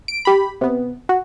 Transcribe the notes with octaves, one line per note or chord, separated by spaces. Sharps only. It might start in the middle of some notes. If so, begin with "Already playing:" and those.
D7
G4 B5
C3 B3
F#4